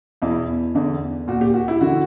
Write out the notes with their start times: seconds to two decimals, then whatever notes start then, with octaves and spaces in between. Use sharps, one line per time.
0.22 E2 B2 E4
0.75 E2 D3
1.28 A#2 F#4
1.41 G4
1.54 F#4
1.68 E4
1.81 D3 F#4